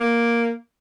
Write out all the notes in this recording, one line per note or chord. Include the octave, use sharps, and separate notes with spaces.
A#3